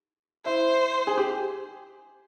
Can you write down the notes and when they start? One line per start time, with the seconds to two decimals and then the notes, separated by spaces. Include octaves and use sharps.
0.46 E4 C5
1.07 G#4
1.18 G4